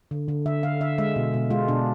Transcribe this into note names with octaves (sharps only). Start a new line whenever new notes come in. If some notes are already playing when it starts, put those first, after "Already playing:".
D3
D3
D3 E5
D3 F5
D3 E5
G#3 E5
B2
B2
G#3 F4
B2 D4